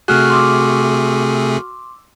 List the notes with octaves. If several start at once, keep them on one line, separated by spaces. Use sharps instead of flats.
C3 A3 F#4 G#4 F6 F#6
C6 D6 E6